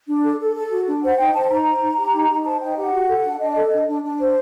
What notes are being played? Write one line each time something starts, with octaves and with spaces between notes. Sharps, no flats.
D4
A4
A4
A4
F#4
D4
C5 F#5
D#4 G5
C5 A5
D#4 A#5
C5
D#4
G4
D#4
D#4
C5 A5
D#4 G5
G4 F#5
F#4
A4
D4
D4 D#5
A4
D4
D4
D4
C5